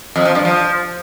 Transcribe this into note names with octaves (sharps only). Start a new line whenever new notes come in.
F2
F3
G2
F3